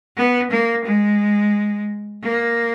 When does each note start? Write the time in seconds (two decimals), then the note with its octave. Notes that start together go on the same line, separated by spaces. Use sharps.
0.17 B3
0.51 A#3
0.85 G#3
2.23 A#3